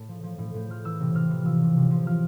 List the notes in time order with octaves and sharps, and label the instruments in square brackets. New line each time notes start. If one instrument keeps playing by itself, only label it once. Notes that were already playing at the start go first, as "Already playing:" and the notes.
Already playing: [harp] A2 A5
F3
F3
A2
A2 G6
F3 F6
E3 E6
C3
C3 F6
E3
F3 E6 F6
C3
C3
F3
F3 F6